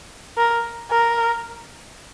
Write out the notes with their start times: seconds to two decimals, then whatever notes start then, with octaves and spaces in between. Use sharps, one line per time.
0.37 A#4
0.91 A#4